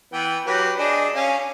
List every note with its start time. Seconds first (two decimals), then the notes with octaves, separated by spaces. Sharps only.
0.13 E3 B3 G5
0.46 F#3 G4 B4
0.78 D4 G#4 D#5
1.15 C#4 F5